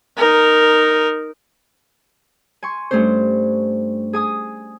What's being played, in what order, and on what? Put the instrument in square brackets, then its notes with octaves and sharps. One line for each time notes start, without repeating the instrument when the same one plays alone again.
[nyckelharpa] D#4 A#4
[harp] G#5 C6 C#6
G2 A3 C#4 D4 C5
G#4 G#5 D#6